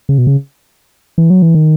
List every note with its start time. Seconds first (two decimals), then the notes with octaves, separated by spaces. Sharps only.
0.09 C#3
0.18 B2
0.27 C#3
1.18 E3
1.30 F#3
1.42 E3
1.54 D#3